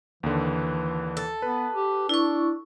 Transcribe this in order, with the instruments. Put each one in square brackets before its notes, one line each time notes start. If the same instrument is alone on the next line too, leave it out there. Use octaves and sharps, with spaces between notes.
[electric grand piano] D#2 D3 [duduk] E3
[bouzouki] A4
[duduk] B3 [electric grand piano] B4
[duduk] G4
[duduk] D4 [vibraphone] E4 C#6